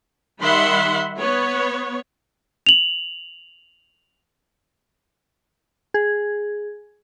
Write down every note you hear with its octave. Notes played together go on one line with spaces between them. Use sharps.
D#3 G3 E5 F#5 B5 C6
B3 C#5
F7 F#7
G#4